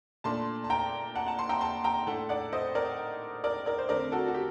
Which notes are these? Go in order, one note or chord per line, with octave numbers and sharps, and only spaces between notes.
A#2 A3 D4 A5 C6
A5
G5 A#5
F#5 A5
F#5 A5
A5 C6
G5 A#5
A5 C6
G5 A#5
A2 A3 D4 F#5 A5
D5 F#5
C5 D#5
A#4 D5
A#4 D5
A#4 D5
C5
D3 A3 C4 A#4 D5
F#4 A4
F#4
G4